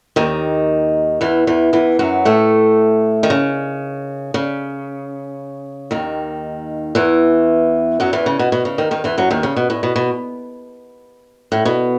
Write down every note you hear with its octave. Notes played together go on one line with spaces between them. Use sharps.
D#2 D#3
E2 E3
E2 E3
E2 E3
F#2 F#3
A2 A3
D#3
C#3
C#3
D#2 D#3
E2 E3
F#2 F#3
E2 E3
C#3
B2
B2
C#3
D#2 D#3
D#2 D#3
E2 E3
F#2 F#3
D#2 D#3
C#3
B2
A2
B2
B2
A2
B2